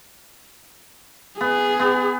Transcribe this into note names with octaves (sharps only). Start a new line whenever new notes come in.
B3 G#4
B3